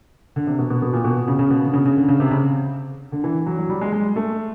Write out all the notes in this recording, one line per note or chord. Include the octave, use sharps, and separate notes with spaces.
D3
C3
B2
B2
B2
A#2
B2
C#3
C#3
B2
D3
C#3
C#3
D3
C#3
C3
C#3
D3
E3
F#3
F#3
G3
G#3
G#3
A3